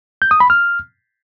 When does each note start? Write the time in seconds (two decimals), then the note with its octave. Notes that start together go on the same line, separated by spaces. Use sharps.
0.22 G6
0.31 D#6
0.40 B5
0.50 F6